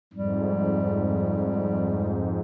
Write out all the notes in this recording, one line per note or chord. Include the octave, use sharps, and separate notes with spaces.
F2 G#2 G3